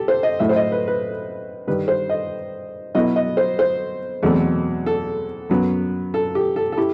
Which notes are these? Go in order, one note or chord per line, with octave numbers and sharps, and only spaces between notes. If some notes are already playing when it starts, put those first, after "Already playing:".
Already playing: G4 A4
C5
D#5
A2 F#3 A3 E4 E5
C5
D#5
B4
B4
G2 D#3 G3 B4
C5
D#5
B2 F#3 B3 E4 D#5
D#5
C5
C5
E2 B2 F#3 A3 C4
A4
F#2 F#3 B3
A4
G4
A4
A4
E4 G4